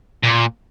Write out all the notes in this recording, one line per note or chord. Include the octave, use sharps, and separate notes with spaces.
A#2